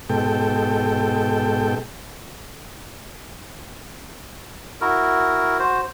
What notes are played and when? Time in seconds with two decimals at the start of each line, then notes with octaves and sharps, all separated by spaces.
0.10 G#2 B2 A4 G5
4.81 E4 F#4 A#4
5.59 F#4 C5